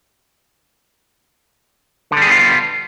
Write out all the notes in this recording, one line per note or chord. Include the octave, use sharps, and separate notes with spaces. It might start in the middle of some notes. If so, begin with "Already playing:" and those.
D3 G3 B3 F4 G#4